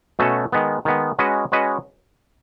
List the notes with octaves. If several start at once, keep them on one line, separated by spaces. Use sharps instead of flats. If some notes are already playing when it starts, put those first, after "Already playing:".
B2 A3 C#4 F#4 A4
D#3 G#3 B3
D#3 G#3 B3
G#3 C#4 F#4 B4 D#5
G#3 C#4 F#4 B4 D#5